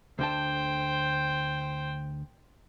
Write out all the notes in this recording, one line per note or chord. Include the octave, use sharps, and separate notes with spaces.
D2 D3 C5 G5 A5